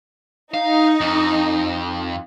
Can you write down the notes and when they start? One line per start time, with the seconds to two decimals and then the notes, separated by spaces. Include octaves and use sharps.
0.54 D#4 F5
1.01 F2